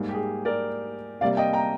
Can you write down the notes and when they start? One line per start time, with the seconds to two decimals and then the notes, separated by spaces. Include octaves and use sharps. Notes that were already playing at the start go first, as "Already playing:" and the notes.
Already playing: G#2 G3 A#3
0.09 G4
0.14 G#4
0.45 A#4 D5
1.21 C3 G3 A#3 D5 F5
1.37 D#5 G5
1.53 G5 A#5